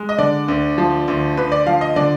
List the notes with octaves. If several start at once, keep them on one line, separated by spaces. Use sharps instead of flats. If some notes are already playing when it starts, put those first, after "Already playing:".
Already playing: G#3
D#5
D3 D5
D2
F3
D2
D2 B4
D5
F3 F5
D#5
D3 D5